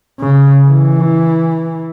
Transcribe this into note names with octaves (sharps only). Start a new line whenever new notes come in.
C#3
E3